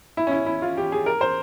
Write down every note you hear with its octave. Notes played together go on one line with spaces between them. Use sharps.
E4
C#4
E4
E4
F4
G4
G#4
A#4
C5